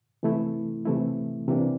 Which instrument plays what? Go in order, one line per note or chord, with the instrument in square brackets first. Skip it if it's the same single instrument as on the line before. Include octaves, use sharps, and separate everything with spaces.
[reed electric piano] C3 E3 A3 E4
C3 E3 A3 E4
C3 E3 A#3 D4